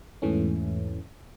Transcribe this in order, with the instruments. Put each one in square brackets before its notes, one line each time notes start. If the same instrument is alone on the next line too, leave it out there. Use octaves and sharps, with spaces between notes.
[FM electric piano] E2 G#2 E3 A3 C#4